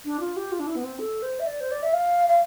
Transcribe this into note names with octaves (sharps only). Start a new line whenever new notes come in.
D4
F4
G4
F4
D4
E4
B3
C4
A4
C5
E5
D5
C5
D5
E5
F5
F5